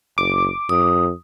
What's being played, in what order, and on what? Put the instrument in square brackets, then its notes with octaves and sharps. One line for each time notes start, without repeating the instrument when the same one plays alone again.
[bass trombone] F#1 [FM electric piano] D6
[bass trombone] F2 [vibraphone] D#6